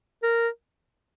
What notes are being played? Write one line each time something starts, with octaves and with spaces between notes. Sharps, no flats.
A#4